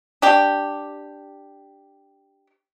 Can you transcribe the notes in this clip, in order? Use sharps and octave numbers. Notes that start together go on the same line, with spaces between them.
D4 G4